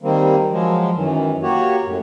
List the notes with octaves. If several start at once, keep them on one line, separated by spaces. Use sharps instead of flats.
D#3 G3 A#3 C4
F3 F#3 G#3
F#2 D#3 E3
A#3 F#4 G4 C#5
F#2 A2